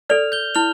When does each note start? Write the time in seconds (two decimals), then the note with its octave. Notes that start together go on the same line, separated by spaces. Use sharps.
0.09 A4 D5 F6 F7
0.32 G6 G7
0.55 E4 F6 F7